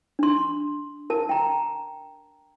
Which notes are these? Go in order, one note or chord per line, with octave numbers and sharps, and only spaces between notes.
D4 C6
A#4 A5
G5 A#5